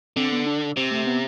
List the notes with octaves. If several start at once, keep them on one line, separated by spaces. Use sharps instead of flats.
D3 C4
B3
D4
C3 C4
A3
B3